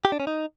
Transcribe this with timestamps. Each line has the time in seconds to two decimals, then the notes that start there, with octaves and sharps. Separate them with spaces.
0.05 G4
0.12 D4
0.20 C#4
0.27 D#4